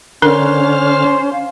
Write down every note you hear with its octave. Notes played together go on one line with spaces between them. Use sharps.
D3 C#4 D4 A#4 C5 F6
F5